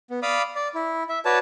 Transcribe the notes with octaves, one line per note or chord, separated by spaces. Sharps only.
B3
D5 F5 B5 D6 D#6
D5
E4
E5
F#4 B4 C#5 D5 A5